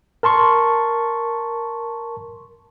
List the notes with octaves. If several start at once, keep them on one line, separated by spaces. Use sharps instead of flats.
A#4 A5 C6 C#6